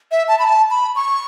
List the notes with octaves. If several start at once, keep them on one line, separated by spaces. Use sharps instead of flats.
E5
A5
B5
A5
B5
C#6